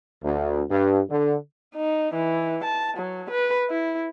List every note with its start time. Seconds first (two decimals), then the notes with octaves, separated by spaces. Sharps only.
0.23 D2
0.70 G2
1.10 D3
1.75 D#4
2.15 E3
2.64 A5
2.97 F#3
3.30 B4
3.70 E4